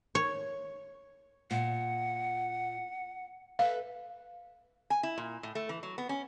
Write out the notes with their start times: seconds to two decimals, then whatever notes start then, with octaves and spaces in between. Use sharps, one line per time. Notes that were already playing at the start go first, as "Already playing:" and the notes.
0.15 C#5
1.51 A#2 F#5
3.59 A4 B4 E5 F5
4.90 G#5
5.03 E4
5.18 A#2
5.43 A2
5.55 A3
5.69 E3
5.83 F#3
5.98 B3
6.09 C#4